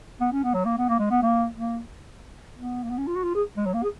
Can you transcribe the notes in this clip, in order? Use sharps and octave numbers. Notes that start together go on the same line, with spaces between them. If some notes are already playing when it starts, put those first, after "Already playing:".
B3
C#4
B3
F#3
A#3
B3
A#3
G#3
B3
A#3
A#3
B3
A#3
B3
C#4
F4
F#4
F4
G#4
G#3
F#3
A#3
G#4